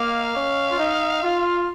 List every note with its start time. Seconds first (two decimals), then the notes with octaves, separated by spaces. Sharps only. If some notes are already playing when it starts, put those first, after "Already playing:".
Already playing: A#3 F5
0.35 C#4
0.71 F4
0.79 D#4
1.23 F4